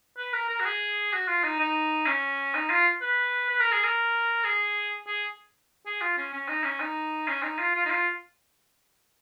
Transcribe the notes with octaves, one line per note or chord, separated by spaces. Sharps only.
B4
A#4
A#4
F#4
G#4
F#4
F4
D#4
D#4
C#4
D#4
F4
B4
B4
A#4
G#4
A#4
G#4
G#4
G#4
F4
C#4
C#4
D#4
C#4
D#4
C#4
D#4
F4
F4
D#4
F4